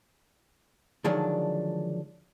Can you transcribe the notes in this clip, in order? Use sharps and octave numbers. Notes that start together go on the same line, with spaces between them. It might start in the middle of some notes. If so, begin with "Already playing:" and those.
D3 D#3 F3 F#3 G#3 D4